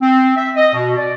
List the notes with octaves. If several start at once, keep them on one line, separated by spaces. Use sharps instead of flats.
C4
E5
D#5
B2
D5